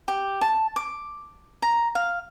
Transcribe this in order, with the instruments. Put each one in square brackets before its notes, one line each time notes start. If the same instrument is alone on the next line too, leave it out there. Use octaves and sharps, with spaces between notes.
[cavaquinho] G4
A5
D6
A#5
F5